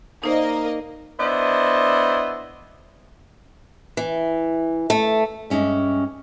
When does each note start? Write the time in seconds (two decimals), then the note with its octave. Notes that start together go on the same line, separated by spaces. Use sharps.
0.24 A#3 D#4 C5 D5 D#5
1.20 B3 D4 E4 C5 D#5
3.97 E3
4.90 A3
5.50 G2 G#3 C#4 E5